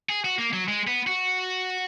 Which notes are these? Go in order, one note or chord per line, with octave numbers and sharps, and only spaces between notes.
G#4
F#4
A#3
F#3
G#3
B3
F#4